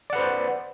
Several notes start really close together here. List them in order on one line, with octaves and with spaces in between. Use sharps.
D5 F#5 B4 C5